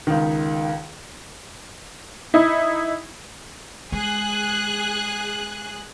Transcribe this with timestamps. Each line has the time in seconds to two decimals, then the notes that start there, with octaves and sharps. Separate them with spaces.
0.07 C#2 D#3
2.34 D#4 E4
3.92 G#3 G#4 F#6